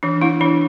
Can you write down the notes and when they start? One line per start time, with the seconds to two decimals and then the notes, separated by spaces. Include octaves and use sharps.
0.03 E3 D4
0.22 B3 D4 E4
0.40 E3 D4